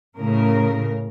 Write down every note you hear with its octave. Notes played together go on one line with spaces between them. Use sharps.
A2 C#3 A#4